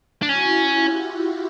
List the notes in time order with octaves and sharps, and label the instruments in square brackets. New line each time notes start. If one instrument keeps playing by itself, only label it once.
[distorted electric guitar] D4
[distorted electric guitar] C#4 [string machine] E4 F#4
[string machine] F4 G4